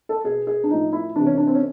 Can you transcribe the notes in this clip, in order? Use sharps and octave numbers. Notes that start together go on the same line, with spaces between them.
A4
B2 G#4
G#4
D4
A2 F3 D#4
E4
C3 E3 D4
C#4
D4
C4
C#4